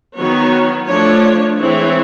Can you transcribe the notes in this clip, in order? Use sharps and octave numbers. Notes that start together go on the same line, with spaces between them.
D#3 F#3 B3 C#5
F3 A3 D4 C#5
E3 G#3 C4 E4 C#5